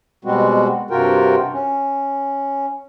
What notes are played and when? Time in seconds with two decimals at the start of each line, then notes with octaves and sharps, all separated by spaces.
0.25 B2 G3 G#3 C4 F#4
0.91 G2 C3 F4 F#4 A#4 G5
1.53 C#4